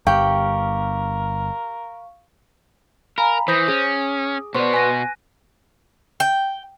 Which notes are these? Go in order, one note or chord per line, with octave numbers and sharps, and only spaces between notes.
G1 G2 G4 A#4 F5 G5 C#6
A#4 F5 G#5 A#5 B5
E3 C5 D#6 G6 A#6
C#4 G#4
B2 B3 B4 C5 D5 C6 C#6
G#5 F#6 A#6 D#7
G5